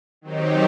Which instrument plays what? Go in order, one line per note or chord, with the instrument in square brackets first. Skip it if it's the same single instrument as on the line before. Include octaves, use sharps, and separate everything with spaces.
[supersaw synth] D#3 F#3 C4 D#4 G4